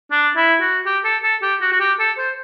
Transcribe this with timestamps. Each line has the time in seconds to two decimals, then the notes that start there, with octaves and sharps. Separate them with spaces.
0.11 D4
0.36 E4
0.61 F#4
0.86 G4
1.04 A4
1.23 A4
1.42 G4
1.61 F#4
1.72 F#4
1.80 G4
1.99 A4
2.18 C5